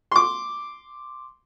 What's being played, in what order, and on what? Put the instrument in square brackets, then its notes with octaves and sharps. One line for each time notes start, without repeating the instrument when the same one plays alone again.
[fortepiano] C6 D6